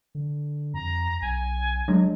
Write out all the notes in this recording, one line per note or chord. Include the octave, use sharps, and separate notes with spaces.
D3
F2 A#5
B1 G#5
F#3 G#3 D4